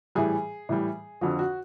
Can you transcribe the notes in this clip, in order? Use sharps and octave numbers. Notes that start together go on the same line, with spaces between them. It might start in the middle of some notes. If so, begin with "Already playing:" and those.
A2 E3 G3 G#4
A2 E3 G3
F2 D3 F3 F#4
F#4